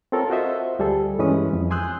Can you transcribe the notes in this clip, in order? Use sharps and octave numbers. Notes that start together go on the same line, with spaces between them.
C4 F4 A4 A#4 C#5
F4 F#4 C5 D#5 E5
D2 G3 G#4 A4
G2 E3 G#3 C#4 B5 D#6
F2
G#5 C6 D#6 E6 F#6 G6